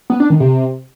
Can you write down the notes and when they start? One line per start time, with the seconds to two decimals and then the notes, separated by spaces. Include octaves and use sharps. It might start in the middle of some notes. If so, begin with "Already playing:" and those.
0.10 B3
0.20 D4
0.30 D#3
0.40 C3